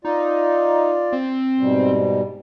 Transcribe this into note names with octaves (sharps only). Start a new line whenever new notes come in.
D#4 F4 D5
C4
G#2 B2 G3